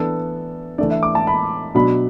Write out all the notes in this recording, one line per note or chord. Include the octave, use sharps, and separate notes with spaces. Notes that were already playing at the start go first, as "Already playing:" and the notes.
Already playing: E3 B3 D4 A4
E3 A3 D4 D5
E5
D6
A5
B5
B2 F#3 D4 B5